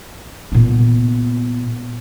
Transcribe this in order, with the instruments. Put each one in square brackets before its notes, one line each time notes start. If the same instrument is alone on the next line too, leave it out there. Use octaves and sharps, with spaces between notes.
[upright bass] A#2 B3